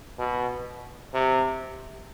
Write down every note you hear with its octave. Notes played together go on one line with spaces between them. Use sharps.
B2
C3